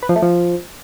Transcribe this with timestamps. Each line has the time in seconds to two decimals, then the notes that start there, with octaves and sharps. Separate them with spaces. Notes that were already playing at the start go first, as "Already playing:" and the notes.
0.03 B4
0.09 F3
0.16 A3
0.22 F3